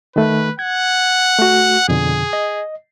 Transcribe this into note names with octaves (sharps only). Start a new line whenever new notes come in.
D#3 A3 B4
F#5 G#6
A3 F#4
F2 B2 D3 G#4
D#5